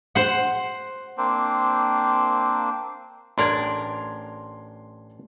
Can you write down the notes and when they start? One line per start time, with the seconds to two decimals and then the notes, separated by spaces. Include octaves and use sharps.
0.15 C5 F#5
1.18 A#3 C4 D4 C5
3.38 A1 D4 A#4 C6 G#6